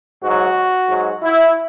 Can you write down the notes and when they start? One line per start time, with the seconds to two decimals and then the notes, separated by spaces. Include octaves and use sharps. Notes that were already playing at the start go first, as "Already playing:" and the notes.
0.24 G#2 F#4
0.29 F#3
0.90 G#2 F#3
1.23 E4